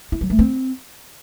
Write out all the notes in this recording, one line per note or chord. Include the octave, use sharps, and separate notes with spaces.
E4
F#3
A3
C4